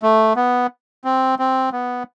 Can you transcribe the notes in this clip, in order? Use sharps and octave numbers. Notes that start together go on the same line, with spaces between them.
A3
B3
C4
C4
B3